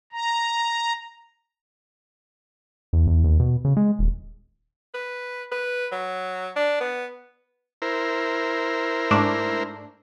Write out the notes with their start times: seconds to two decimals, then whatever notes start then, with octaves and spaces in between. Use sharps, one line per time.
0.12 A#5
2.93 E2
3.07 E2
3.24 D#2
3.40 B2
3.65 C#3
3.77 G#3
3.99 D#1
4.94 B4
5.52 B4
5.92 F#3
6.56 D4
6.81 B3
7.82 E4 A#4 C5
9.11 G#2 A3 D4